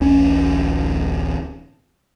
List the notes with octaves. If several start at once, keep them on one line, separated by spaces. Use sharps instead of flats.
D1 A1 C#4